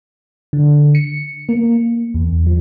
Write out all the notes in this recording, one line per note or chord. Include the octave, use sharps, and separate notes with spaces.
D3
C#7
A#3
E2
F3